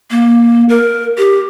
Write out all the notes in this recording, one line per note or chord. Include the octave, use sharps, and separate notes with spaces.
A#3
A#4
G4